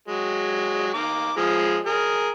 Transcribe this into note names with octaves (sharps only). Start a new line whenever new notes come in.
F#3 G#3
D#3 A#5 D6
F3 G#3 G#4
G#4 A#4